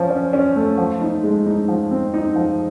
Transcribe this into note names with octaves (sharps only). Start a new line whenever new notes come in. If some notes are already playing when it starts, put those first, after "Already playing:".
Already playing: F3 C#4
C#4
C#4
A3
F3
D#4
G#3
D#4
F3
C4
D#4
F3